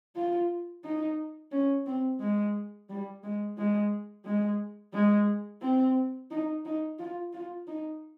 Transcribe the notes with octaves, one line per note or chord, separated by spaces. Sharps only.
F4
D#4
C#4
C4
G#3
G3
G#3
G#3
G#3
G#3
C4
D#4
D#4
F4
F4
D#4